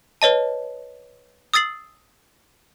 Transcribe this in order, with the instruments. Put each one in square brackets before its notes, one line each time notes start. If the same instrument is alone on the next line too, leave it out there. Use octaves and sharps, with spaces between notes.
[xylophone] B4 C#5 D#5 A5
D#6 E6 A6 C7 F#7